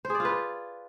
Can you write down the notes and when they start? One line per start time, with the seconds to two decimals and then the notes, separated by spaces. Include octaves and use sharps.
0.05 C5
0.10 G#4
0.15 D5
0.20 F4
0.25 B4